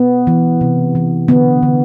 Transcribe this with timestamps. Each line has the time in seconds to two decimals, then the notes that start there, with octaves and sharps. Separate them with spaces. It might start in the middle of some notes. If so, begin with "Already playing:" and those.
Already playing: B3
0.27 E3
0.61 C3
0.95 E3
1.28 D3 B3
1.63 D3